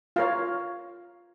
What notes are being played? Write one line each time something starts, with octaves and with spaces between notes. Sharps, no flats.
F4 A#4 C#5 F5